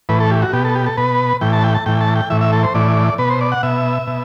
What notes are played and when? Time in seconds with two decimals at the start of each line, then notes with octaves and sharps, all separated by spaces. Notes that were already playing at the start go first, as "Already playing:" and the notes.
0.09 A2 E3 B4
0.20 A4
0.31 G4
0.42 F#4
0.53 B2 G4
0.64 A4
0.75 G4
0.86 A4
0.97 B2 B4
1.41 A2 E3 G5
1.53 A5
1.64 G5
1.74 A5
1.86 A2 E3 G5
2.01 A5
2.16 G5
2.30 A2 E3 E5
2.41 E5
2.53 A4
2.63 C5
2.74 A2 E3 D5
3.18 B2 B4
3.30 C5
3.41 D5
3.52 F#5
3.63 B2 E5
4.07 B2